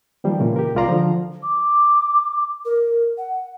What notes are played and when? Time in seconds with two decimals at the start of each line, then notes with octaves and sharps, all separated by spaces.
0.24 D#3 F3 G3 A#3
0.38 A#2 C#3 E3
0.56 G4 A#4
0.75 C2 G#3 F4 D5 A#5 C6
0.89 D3 F3
1.43 D6
2.65 A#4
3.18 F#5